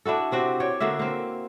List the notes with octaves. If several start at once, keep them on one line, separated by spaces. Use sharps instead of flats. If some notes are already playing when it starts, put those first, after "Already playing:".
D4 E4 F#4 A4
C3 C4 F#4 G4
C#5 D5 G5
D3 A#3 F#4 E5
A#3 C4